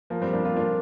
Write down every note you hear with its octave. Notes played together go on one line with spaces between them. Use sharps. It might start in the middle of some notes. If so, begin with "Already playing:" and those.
F3 A#3
G3 C4
A#3 D4
C4 F4
A#3 D4